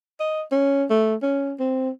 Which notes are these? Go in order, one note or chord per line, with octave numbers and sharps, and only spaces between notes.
D#5
C#4
A3
C#4
C4